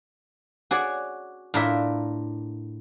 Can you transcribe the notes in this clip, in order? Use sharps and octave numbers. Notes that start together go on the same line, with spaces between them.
F#4 G#4 C#5 D5
A2 D4 F4 A#4 E5